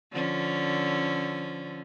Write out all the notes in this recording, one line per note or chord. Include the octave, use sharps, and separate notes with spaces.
D3 F3 C#4